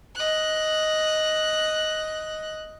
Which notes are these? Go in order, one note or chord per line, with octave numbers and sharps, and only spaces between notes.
D#5 F#6